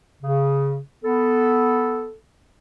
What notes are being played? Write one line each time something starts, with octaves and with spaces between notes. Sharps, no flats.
C#3
B3 A4